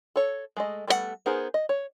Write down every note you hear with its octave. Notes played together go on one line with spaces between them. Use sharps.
A4 C#5
G#3 A3 D#5
G3 A3 B3 E4 F#5
B3 D#4 G#4 A#4 C5
D#5
C#5